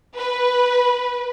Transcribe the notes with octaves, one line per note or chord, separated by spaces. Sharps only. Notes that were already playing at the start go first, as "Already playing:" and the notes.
B4